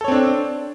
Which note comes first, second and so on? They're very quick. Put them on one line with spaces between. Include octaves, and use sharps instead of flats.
A4 C#5 C4 D4